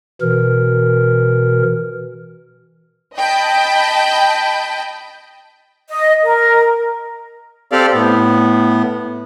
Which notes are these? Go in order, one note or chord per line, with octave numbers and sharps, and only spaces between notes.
B2 E3 A#4
D#5 G5 A5 B5
D#5
A#4
C4 G4 A4 D5 F5
A2 B3